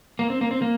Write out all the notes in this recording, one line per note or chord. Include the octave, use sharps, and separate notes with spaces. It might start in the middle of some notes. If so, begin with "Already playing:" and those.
A#3
C4
A#3
C4
A#3